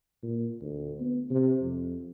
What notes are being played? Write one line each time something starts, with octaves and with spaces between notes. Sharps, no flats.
A#2
D2
B3
C3
F2